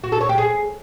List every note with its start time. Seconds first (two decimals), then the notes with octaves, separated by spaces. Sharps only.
0.04 F#4
0.12 A4
0.21 C#5
0.29 G4
0.38 G#4